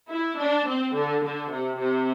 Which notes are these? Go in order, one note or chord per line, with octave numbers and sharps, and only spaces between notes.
E4
D4
C4
D3
D3
C3
C3